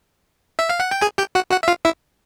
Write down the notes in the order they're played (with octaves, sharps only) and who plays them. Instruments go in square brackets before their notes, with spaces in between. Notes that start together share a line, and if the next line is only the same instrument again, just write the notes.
[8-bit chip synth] E5
F5
F#5
G5
G#4 G#5
G4 G5
F#4 F#5
F#4 F#5
E5
F4 F5
E4 E5